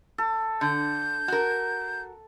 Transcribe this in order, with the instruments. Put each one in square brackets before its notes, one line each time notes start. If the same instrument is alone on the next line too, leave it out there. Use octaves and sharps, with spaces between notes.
[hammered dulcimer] A4
[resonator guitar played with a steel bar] D3 [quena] G6
[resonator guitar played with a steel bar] F#4 A#4